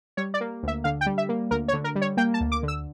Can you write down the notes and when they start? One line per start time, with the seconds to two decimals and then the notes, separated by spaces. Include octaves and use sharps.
0.17 G3 C#5
0.34 D5
0.41 A#3
0.63 D2 E5
0.84 D3 F5
1.01 G5
1.06 G3
1.18 E5
1.29 A#3
1.51 D2 A#4
1.68 C#5
1.73 D3
1.84 A#4
1.95 G3
2.02 C#5
2.17 A#3 G5
2.34 A5
2.41 D2
2.52 D6
2.63 D3
2.68 E6